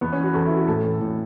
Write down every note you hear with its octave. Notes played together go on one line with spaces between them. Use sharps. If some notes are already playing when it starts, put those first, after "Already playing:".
E2 B3
C#4
E3
F#4
E2 A4
E3 E4
F#4
A2 A4
E3
A2